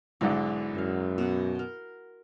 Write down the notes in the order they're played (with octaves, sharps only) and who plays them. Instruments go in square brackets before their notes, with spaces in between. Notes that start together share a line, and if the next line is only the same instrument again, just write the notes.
[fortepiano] B1 G#2 D3 [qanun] E4 G#4
[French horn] F#2 [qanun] E5 F5
[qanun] B2 B3 F#5
A#4 C6